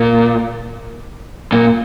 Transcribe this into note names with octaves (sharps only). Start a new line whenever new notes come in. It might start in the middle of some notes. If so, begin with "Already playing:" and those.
Already playing: A#2
A#2